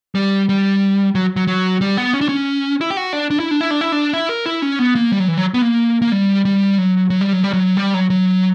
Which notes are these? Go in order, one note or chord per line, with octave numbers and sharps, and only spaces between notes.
G3
G3
F#3
F#3
F#3
G3
B3
C#4
D4
C#4
E4
G4
F#4
D4
D4
E4
D4
E4
D4
E4
D4
E4
A#4
E4
C#4
B3
A#3
G3
F#3
E3
F#3
B3
A#3
A#3
G3
G3
F#3
F#3
G3
F#3
G3
F#3
G3
F#3
F#3